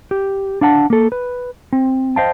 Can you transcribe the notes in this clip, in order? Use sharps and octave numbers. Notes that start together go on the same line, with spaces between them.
G4
D4 F5 F#5 A5
A#3 A4
B4
C4
C5 D#5 F5 G5 A5